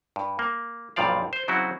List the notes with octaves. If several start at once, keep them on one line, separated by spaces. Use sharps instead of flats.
G2
A#3
B1 G2 A#2 F3 D5 F5
C5
C#3 F#3 C4 E4 F#4